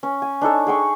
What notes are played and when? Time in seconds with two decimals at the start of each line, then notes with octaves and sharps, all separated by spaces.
0.03 C#4
0.22 G#5
0.41 D4 D#4 A4 C#5
0.67 G#4 G5 C#6